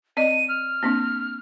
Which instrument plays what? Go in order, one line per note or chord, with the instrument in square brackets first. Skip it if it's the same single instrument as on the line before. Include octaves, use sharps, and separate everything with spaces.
[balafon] C4 D5 D#5 [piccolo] D#7
[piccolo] F6
[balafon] A#3 C4 D4